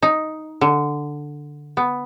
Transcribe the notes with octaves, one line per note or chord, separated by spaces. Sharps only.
D#4
D3
B3